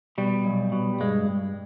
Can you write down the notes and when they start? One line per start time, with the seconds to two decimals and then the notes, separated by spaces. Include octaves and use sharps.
0.18 B2 G3
0.45 B1
0.72 B2
1.00 G2 G#3
1.28 G2